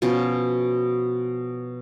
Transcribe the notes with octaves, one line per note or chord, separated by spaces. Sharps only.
B2 F3 C#4